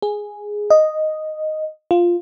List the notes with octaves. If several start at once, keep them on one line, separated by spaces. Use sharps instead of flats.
G#4
D#5
F4